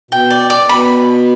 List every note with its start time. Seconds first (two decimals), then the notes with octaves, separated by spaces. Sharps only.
0.11 B2 G5
0.30 D5
0.50 D5
0.69 B2 B5